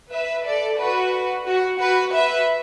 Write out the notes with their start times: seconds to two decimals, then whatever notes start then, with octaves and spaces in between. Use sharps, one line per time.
0.12 B4 E5
0.45 A4 D5
0.79 F#4 B4
1.46 F#4
1.79 F#4 B4
2.13 B4 E5